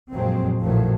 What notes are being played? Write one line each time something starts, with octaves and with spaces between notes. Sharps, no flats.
F#1 F2 A#2 F#3 G#3 C4
A#1 A2 D#3 F3 F#3 A3